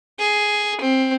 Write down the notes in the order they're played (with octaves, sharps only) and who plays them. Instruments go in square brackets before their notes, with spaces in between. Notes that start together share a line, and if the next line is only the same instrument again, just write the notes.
[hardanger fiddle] G#4
C4